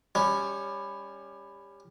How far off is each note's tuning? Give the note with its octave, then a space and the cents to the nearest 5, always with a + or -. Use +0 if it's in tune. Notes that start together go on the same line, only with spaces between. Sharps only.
G3 +20 C#4 +0